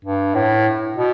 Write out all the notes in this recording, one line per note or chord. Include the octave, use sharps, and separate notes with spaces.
G2
A2
B2